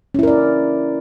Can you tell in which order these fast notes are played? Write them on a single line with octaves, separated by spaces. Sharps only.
C#4 E4 A#4 D5